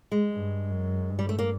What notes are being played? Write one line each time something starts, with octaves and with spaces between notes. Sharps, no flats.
G#3
G2
F#2
G2
G3
A3
A#3